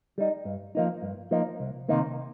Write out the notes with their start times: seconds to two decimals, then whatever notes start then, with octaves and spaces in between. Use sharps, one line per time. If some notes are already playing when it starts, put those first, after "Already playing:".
0.18 G3 D#4
0.45 G2
0.75 F3 A#3 D#4
1.03 G2
1.31 F3 A#3 D#4
1.60 C2
1.89 C3 D#3 A#3 D#4